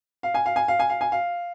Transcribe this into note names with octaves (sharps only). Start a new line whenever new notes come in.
F5
G#5
F5
G#5
F5
G#5
F5
G#5
F5